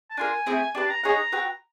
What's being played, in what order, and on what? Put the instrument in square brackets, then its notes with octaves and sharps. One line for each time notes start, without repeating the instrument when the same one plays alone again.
[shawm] A5
[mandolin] D4 F4 A#4 [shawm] G#5
[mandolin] A3 C4 E4 G#4
[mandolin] D4 G4 B4 [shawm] A5
[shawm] A#5
[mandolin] D#4 G#4 C#5 F#5 [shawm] A#5
[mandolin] F#4 B4 E5 G5